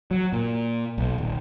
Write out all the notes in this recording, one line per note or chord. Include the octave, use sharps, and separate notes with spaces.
F#3
A#2
B1
D#1